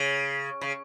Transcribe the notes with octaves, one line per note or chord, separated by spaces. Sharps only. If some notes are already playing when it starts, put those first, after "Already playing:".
Already playing: C#3
C#3